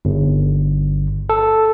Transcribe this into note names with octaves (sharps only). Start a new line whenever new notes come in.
G1
A4